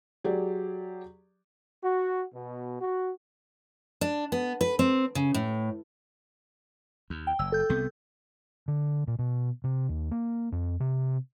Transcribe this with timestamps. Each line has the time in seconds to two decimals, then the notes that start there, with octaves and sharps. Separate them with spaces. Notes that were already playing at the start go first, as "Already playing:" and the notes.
0.24 F#3 G4 G#4 D5
1.84 F#4
2.33 B2
2.80 F#4
4.01 D4
4.32 B3
4.61 B4
4.79 C4
5.15 C#3
5.34 A2
7.10 D#2
7.27 G5
7.39 F#1 E6
7.52 A4 G6
7.69 C2 C3 B3
8.68 D3
9.07 A#2
9.19 B2
9.64 C3
9.89 D#2
10.11 A#3
10.52 F2
10.80 C3